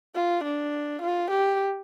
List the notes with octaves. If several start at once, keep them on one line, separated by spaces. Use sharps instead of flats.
F4
D4
F4
G4